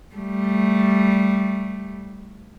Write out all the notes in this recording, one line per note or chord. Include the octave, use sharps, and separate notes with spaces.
G3 A3